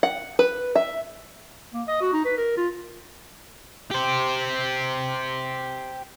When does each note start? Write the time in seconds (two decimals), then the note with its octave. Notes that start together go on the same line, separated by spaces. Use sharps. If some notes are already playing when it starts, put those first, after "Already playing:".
0.03 F#5
0.39 B4
0.75 E5
1.73 A#3
1.88 D#5
2.02 F#4
2.13 D#4
2.25 B4
2.38 A#4
2.57 F4
3.91 G4 C5